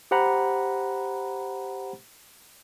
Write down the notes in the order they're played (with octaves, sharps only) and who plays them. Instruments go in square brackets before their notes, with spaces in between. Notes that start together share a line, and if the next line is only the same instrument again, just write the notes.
[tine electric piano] G4 C5 F#5 A#5 B5